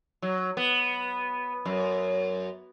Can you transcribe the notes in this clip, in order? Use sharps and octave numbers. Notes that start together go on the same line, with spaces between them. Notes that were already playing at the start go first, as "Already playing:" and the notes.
F#3
B3
F#2